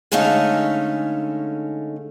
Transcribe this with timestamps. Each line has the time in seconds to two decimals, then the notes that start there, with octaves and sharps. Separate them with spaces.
0.12 D3 G#3 A3 C#4 D#4 F5